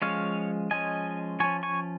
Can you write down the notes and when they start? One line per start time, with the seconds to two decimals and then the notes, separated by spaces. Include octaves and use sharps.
0.02 F3 G#3 C#4 C#5 F5
0.71 F3 G#3 C#4 D#5 G#5
1.40 F3 C#4 G#5 C#6
1.63 G#5 C#6